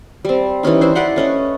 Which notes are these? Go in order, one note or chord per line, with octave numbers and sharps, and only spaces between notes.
G3 C4
E3 G3 C#4 D#4
D4 E4 C5
B4 D5 F#5 C6
A3 C#4 D#5